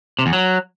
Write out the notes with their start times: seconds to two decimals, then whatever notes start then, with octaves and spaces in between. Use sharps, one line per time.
0.19 C3
0.26 E2
0.33 F#3